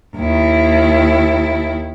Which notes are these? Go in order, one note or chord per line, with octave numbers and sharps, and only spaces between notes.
D#2 E4